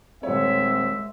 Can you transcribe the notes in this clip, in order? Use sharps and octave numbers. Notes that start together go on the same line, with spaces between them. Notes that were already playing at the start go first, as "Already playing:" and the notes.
D#1 G#3 C4 C#5 E5